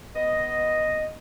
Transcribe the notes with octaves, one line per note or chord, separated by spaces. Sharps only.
B3 D#5